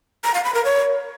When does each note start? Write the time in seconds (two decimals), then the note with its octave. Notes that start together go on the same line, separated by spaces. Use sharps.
0.24 A#5
0.34 F5
0.44 B5
0.55 A#4
0.65 C#5